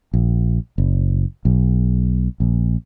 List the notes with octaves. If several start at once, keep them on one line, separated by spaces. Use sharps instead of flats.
A#1
F#1
B1
A#1